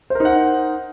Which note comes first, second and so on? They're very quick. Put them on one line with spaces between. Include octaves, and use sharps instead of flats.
C5 A#4 D#4 F#5